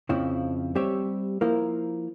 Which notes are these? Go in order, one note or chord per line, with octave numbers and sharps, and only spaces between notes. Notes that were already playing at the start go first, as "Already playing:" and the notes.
F2 C#3 F3 C4 E4
G3 C4 G4 C#5 E5
F3 A#3 E4 A#4